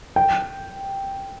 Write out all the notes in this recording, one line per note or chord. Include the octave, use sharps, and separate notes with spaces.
G5